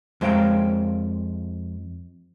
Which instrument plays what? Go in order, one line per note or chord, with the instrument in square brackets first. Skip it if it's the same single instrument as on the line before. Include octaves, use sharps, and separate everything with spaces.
[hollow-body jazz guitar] F2 G#3 C5 F5 G5 A#5